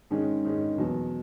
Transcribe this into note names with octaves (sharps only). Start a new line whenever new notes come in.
G#2 D#3 G#3 C#4
G#2 D#3 G#3 C#4
E2 B2 F#3